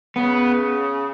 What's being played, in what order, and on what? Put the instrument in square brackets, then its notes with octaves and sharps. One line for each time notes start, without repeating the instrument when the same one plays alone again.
[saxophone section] C#3 [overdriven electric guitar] B3